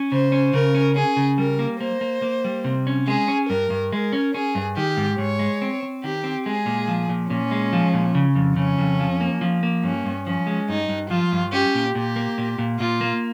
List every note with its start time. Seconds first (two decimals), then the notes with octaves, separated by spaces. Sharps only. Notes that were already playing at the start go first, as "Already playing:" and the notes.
Already playing: C#4
0.12 C#3 C5
0.32 C#4
0.54 C#3 A#4
0.74 C#4
0.96 C#4 G#4
1.16 C#3
1.38 G3 A#4
1.59 A#3
1.80 A#3 C5
2.01 A#3
2.22 A#3
2.45 G3
2.64 C3
2.87 C#4
3.08 G#3 G#4
3.28 C#4
3.49 G2 A#4
3.70 G2
3.92 G#3 A#4
4.13 C#4
4.34 C#4 G#4
4.55 G2
4.77 D#3 G4
4.97 G#2
5.18 G#2 C#5
5.39 G#3
5.62 C4
5.83 C4
6.04 D#3 G4
6.24 C4
6.46 G#3 G#4
6.66 A#2
6.88 F3
7.09 A#2
7.30 A#2 C#4
7.51 G#3
7.73 F3
7.94 A#2
8.15 C#3
8.36 F2
8.56 C#3 C#4
8.78 F2
9.00 F3
9.21 A#3
9.41 F3
9.63 A#3
9.83 G2 C#4
10.06 G2
10.26 F3 C#4
10.47 G#3
10.69 G2 D#4
10.89 G2
11.10 F3 F4
11.32 G2
11.52 C#4 G4
11.75 A#2
11.95 A#2 G4
12.16 A#3
12.38 A#2
12.58 A#2
12.80 A#2 F4
13.01 A#3